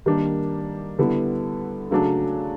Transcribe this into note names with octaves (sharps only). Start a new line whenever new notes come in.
D#3 G3 A#3 D4
D3 G3 B3 E4
C#3 F#3 A3 D4